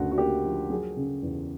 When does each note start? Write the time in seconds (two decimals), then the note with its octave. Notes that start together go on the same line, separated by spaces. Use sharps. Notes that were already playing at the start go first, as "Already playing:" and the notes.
Already playing: D2 C#3 F#4
0.11 F#4
0.18 A#3 G4
0.45 F3
0.70 F#3 G#4
0.97 C#3
1.23 E2